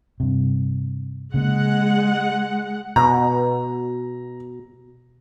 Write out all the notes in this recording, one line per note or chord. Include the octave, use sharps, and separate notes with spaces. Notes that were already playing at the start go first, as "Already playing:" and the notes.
G2 C3
C#3 G#3 A#3 F#5
B2 A#5